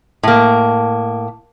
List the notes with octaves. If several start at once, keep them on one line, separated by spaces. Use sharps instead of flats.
A2 A#3